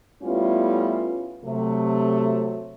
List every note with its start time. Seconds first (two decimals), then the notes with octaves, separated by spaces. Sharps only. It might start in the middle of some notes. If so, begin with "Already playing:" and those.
0.23 G3 A3 B3 C#4 E4 F4
1.44 C3 F#3 A3